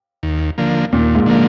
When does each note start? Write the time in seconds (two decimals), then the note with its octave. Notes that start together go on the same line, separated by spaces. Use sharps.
0.23 D#2
0.58 D3 F3 A#3
0.92 D#2 A#2
1.15 G#2
1.26 D3 F3 A#3